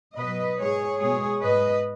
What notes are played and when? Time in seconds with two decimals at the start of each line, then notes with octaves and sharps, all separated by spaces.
0.17 B2 F#3 B4 D#5
0.59 G#2 G#3 G#4 C#5
1.00 B2 G#3 G#4 C#5
1.41 G#2 G#3 B4 D#5